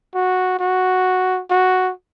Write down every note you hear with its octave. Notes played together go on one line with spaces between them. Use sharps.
F#4
F#4
F#4